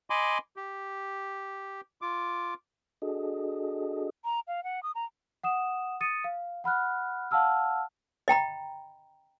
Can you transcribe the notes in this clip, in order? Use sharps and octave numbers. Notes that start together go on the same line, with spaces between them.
D#5 G#5 B5 C6 D6
G4
F4 D6
D4 F#4 G#4 A4 D#5
A#5
F5
F#5
D#6
A#5
F#5 D#6 E7
D#6 A6 C#7 D#7
F5
F#5 B5 F6 F#6
F5 F#5 A5 E6 F6
D#5 G5 A#5 B5